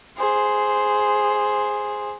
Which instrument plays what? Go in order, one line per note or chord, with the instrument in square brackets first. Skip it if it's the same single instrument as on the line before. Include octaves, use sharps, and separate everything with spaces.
[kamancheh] G#4 C5